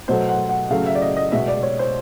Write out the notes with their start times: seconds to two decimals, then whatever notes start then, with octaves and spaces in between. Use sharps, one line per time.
0.08 B2 F#3 A3 C5
0.29 F#5
0.49 F#5
0.70 C#3 F#3 A3 F5
0.86 E5
0.95 D5
1.02 D#5
1.17 D#5
1.32 B2 G#3 E5
1.48 D5
1.63 C#5
1.79 C5